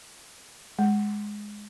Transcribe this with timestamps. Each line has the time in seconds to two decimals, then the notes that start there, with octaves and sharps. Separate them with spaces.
0.79 G#3